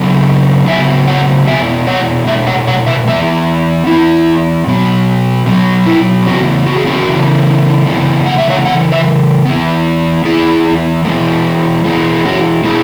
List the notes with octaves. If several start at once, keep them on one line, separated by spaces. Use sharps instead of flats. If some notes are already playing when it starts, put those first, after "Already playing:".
Already playing: C#3 F#3 B3
C#3 F#3 B3 E5 G#5
C#5 F#5
B2 G#3 B3 E5 G#5
C#5 F#5
B2 G#3 E5
C#5 F#5
C#5 F#5
B4 E5
E3 B3 B4 E5
E3 B3 E4
B2 F#3 B3
B2 F#3 B3
E4
C#3 E3 B3 C#4 F#4
F#4
G#4
C#4 F#4
C#3 E3 B3
C#3 E3 G#3 B3
F#5
E5
C#5 F#5
C#3 E3 F#5
B4 E5
E3 B3
E3 B3 E4 G#4
E3 G#3 B3
E3 G#3 B3
C#4 F#4
B2 G#3 B3 E4 G#4